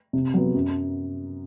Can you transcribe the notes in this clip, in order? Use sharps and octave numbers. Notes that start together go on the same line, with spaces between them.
C3
F#3 B3
F#2